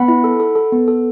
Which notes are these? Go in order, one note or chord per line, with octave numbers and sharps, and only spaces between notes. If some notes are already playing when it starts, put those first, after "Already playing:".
Already playing: B3 F#5 B5
E4
A4
A4
A4
B3
A4